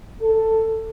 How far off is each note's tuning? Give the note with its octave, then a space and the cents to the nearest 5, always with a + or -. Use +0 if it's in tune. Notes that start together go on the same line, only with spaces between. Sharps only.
A4 +10